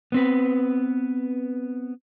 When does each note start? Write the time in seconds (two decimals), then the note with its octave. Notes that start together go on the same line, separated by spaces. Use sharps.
0.12 B3 C4 B4